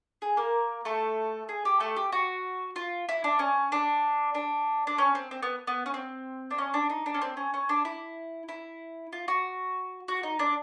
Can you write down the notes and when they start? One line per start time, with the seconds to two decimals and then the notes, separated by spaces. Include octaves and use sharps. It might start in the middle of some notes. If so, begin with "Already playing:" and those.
0.22 G#4
0.37 A#3 A#4
0.85 A3 A4
1.49 G#4
1.65 G4
1.80 A3 A4
1.96 G4
2.12 F#4
2.76 F4
3.09 E4
3.24 D4
3.39 C#4
3.72 D4
4.35 D4
4.87 D4
4.98 C#4
5.15 C4
5.31 C4
5.43 B3
5.67 B3
5.86 C#4
5.94 C4
6.51 D4
6.58 C#4
6.74 D4
6.90 D#4
7.06 D4
7.14 C#4
7.22 C4
7.37 C#4
7.54 C#4
7.69 D4
7.85 E4
8.49 E4
9.13 F4
9.28 F#4
10.08 F#4
10.23 D#4
10.39 D4